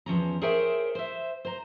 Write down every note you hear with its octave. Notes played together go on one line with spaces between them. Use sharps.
E2 F3 C#4 A#5
G#4 A#4 C5 C#5 E5 G5
C5 E5
C5 A#5